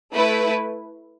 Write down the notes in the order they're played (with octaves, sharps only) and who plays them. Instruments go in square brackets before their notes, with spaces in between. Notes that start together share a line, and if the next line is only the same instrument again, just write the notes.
[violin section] A3 E4 B4